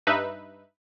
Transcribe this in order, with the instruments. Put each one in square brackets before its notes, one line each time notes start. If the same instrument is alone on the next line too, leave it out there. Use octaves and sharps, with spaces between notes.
[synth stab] G2 D#4 B4 E5